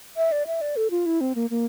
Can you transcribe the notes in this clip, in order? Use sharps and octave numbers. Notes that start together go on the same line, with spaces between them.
E5
D5
E5
D5
A4
F4
E4
C4
A#3
A#3